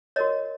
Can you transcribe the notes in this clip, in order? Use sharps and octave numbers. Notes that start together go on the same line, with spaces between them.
F#4 A#4 C#5 D#5